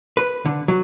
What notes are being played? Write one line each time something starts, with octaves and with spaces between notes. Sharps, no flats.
B4
D3
F#3